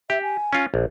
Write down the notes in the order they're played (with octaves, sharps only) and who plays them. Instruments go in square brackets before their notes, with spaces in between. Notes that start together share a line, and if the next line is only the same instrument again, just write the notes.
[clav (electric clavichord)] G4 [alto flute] E5
[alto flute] G#5
[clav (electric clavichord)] C#4 F4
A#1